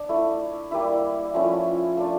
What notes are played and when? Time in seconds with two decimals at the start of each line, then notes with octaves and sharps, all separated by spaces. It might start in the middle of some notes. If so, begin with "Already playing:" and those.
Already playing: D4
0.09 A3 E4
0.71 G3 A#3 E4 E5
1.34 F3 A3 C#4 E4
1.97 A3 D4 F4 F5